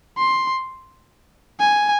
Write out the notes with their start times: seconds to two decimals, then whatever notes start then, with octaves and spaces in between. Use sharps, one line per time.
0.18 C6
1.60 G#5